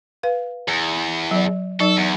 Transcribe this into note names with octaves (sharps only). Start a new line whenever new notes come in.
B4 F5
E2
F#3 D5
F#3 D#4 A4 D5
E2